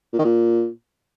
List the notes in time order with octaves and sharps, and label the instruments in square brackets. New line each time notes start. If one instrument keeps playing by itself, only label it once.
[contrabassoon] A#2
D#3
A#2